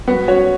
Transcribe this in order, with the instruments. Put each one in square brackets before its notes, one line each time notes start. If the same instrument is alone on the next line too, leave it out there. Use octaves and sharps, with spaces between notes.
[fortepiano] B3 [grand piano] F#4 F#5
[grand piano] C#4 C#5 [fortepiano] F#4